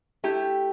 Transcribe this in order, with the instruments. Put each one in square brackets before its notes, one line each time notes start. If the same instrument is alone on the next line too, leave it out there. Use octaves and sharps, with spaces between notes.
[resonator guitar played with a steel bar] A3 E4 G4